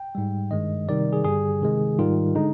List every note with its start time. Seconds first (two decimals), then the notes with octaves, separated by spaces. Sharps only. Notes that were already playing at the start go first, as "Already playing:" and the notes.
Already playing: G5
0.15 G#2 G3
0.51 G2 D#3 G#3 D#5
0.88 C3 D#3 G3 D5
1.13 G#4
1.24 G2 D3 G3 G#4
1.62 C3 D#3 G#3
1.98 G#2 D#3 G3 F4
2.35 D3 G#3 D#4